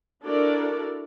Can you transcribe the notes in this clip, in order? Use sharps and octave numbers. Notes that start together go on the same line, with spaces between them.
D4 E4 F#4 A4 A#4 D5